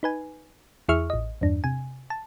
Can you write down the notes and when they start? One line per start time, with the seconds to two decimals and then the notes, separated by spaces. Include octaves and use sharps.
0.03 D#4 B4 G#5
0.89 E2 E4 G#4 E5 C#6 F6
1.10 A1 D#5
1.41 E2 G2 D4
1.64 C3 G#5
2.10 A5